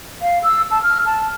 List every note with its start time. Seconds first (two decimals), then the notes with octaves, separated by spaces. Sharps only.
0.22 F5
0.43 E6
0.71 A5
0.83 F6
1.06 A5